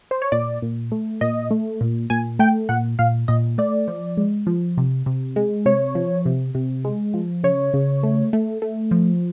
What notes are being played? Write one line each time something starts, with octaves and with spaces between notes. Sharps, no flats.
C5
C#5
A#2 D5
A#2
A3
A#2 D#5
A3
A#2
A#2 G#5
A3 G5
A#2 F#5
A#2 F5
A#2 D#5
A3 D5
F3
G#3
F3
C3
C3
G#3
C3 C#5
F3
C3
C3
G#3
F3
C#3 C#5
C#3
A3
A3
A3
F3